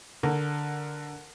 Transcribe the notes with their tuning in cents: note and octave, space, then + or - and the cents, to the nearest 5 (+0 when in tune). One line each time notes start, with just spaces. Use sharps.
D3 +0 A#4 +0 F#5 +0